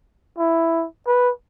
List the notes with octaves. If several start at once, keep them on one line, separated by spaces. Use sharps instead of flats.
E4
B4